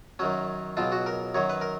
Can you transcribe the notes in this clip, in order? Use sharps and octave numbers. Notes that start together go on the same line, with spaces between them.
F#2 D#3 F#3 C#4
C#2 B2 F#3 F4
F#4
A#4
F#2 D#3 F#3 C#5
B4
A#4